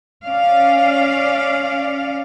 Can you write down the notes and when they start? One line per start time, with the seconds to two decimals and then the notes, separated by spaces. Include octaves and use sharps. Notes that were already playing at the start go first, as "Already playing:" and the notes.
0.24 C#4 D5 F5